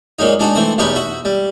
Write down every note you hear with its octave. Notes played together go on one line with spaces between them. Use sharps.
A#2 F#3 G#3 D#4
G#3 D4 D#4 F#4
E3 A3 C4 C5
B1 E2 D#4 G4 B4 C#6
F#4 E5
G3